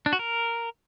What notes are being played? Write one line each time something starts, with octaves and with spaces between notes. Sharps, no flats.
D4
F#4
A#4